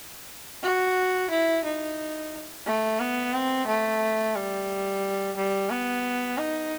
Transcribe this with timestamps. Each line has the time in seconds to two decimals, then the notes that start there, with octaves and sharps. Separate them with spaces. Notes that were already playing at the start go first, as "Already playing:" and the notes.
0.63 F#4
1.31 E4
1.64 D#4
2.66 A3
3.00 B3
3.34 C4
3.67 A3
4.35 G3
5.37 G3
5.71 B3
6.38 D#4